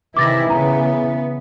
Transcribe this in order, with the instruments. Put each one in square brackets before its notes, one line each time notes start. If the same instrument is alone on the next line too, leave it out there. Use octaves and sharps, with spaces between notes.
[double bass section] C3 D#3 [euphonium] E3 [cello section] E4 [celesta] D6 A6 A#6
[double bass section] C#3 [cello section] B3 [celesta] A#5